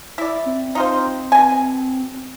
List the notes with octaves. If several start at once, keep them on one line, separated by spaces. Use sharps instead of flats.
E4 D5
C4
D#4 F4 C5
B2 G#5